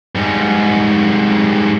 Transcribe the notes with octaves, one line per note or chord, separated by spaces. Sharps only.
G#2 G3